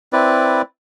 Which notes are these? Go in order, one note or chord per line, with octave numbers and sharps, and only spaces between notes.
C4 E4 B4 D5